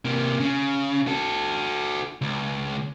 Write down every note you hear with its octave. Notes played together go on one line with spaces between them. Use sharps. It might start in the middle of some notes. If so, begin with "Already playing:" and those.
C3 A#3
C#3
F#4 A4
C#2